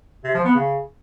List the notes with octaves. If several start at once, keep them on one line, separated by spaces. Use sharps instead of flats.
C3
F3
B3
C#3